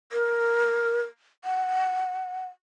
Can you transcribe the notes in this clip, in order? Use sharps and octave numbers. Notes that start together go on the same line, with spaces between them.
A#4
F#5